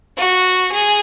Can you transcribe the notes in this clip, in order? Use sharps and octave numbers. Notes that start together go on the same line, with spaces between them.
F#4
G#4